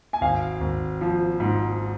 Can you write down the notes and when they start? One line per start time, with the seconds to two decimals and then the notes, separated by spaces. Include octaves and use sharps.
0.13 G#5
0.21 G#1 F5
0.61 G#1
1.01 F3
1.40 G#2